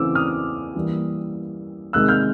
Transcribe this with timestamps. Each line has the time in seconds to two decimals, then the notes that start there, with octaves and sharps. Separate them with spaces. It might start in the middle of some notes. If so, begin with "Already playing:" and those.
Already playing: C#3 E3 A3 C4 D6 E6
0.15 D#6 F6
0.75 E3 G3 A#3
1.93 C3 D#3 G#3 E6 F#6
2.08 F6 G6